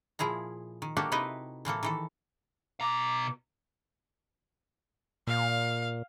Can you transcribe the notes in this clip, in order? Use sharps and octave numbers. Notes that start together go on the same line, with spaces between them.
A#2 F3 E4 G#4 A#5
D#3
A#3 D4 F#4 G4 A4
C3 D#4 E4 B4 D#5
A2 E3 A#3 A4
D#3 E3 A4
B2 A#5 D6
A#2 F5